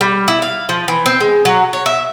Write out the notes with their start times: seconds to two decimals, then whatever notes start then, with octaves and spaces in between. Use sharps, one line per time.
0.01 G3
0.28 E4
0.42 F5
0.69 F3
0.88 E3
1.06 C4
1.20 G#3
1.45 F#3
1.73 C#5
1.86 E5